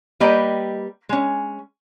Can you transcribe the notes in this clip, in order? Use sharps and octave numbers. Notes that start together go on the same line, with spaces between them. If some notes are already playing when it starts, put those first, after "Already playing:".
G3 A#3 B4 D5 D#5 G5
G#3 C#4